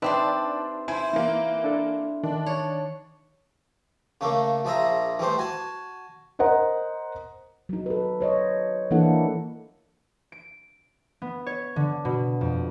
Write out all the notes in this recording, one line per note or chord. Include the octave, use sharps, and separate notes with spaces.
C4 D4 D#4 G4 B4 E5 C6
E4 C5 G#5
E3 A#3
D4 A4
D#3 D4
C#5
C#3 A3 A#3
A#1 F3 G#4 E5 A#5
E3 G3 A3 C5
F#4 G#5 A5
A#4 C5 D#5 F#5 A#5
F#3 D#4
A4 B4
C5 C#5 D#5
E3 A#3 D4 E4 A4 F#5
D7
B3
C#5
D3
B2
F2